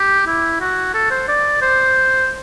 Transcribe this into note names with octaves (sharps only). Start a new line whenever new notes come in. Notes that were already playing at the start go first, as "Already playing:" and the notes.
Already playing: G4
E4
F#4
A4
C5
D5
C5